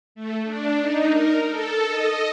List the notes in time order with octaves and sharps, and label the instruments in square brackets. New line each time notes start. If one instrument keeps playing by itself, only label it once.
[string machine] A3
D4
D#4
A#4
A4
D#5